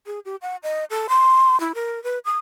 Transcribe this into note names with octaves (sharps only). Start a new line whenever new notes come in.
G#4
G4
F#5
D#5
A4
C6
E4
A#4
B4
D#6